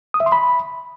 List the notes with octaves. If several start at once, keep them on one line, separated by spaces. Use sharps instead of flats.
D#6
E5
C6
B5